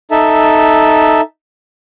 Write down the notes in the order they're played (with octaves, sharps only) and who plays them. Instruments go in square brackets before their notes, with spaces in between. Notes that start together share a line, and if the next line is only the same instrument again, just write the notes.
[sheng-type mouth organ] D#4 A4 E5